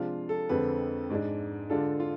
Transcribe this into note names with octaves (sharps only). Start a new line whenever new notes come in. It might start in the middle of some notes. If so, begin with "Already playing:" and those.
Already playing: C3 F3 G#3 D4 F4
A4
F2 D3 G#3 C4 B4
G#2 G#3 D4
D3 G#3 D4 F4 A4
F4